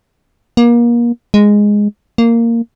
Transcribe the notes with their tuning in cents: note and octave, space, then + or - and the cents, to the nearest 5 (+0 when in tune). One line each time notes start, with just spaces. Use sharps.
A#3 +30
G#3 -5
A#3 -10